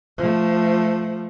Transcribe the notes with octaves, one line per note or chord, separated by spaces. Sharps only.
F3 A3